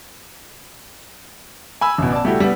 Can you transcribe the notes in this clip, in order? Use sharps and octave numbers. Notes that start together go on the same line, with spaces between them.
G#5 B5 E6
A1 B2
D5 A5
G3 A3 E4 F#4 G4
G3 B3